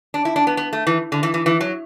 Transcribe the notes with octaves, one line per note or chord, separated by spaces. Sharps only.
D4
E4
D4
B3
B3
A3
E3
D3
E3
E3
E3
F#3